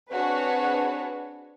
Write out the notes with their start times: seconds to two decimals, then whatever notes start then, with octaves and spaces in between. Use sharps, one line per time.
0.12 C4 D4 F#4 G#4 B4 C#5